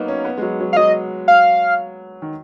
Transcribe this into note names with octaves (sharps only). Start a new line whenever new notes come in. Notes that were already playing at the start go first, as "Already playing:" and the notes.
Already playing: F#3 A#3 B3 D#4 F#4
C#4
B3
G#3
F#3
F#3
F5
F#3 D#5
F5
D#3